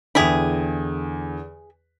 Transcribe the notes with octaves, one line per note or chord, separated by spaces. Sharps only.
E2 D3 E4 G4 G#4